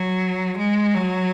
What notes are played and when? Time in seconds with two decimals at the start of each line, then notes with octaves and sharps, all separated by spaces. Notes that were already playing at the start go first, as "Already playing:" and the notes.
Already playing: F#3
0.58 G#3
0.94 F#3